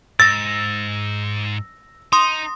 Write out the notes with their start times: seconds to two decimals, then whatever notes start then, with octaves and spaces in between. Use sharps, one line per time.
0.20 G#2 E6 A6 A#6
2.13 D#4 C6 D#6